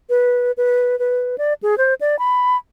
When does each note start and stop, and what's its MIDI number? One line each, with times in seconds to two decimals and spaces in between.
0.09 0.52 71
0.57 0.98 71
0.99 1.36 71
1.38 1.53 74
1.63 1.78 68
1.78 1.94 72
2.01 2.19 74
2.19 2.57 83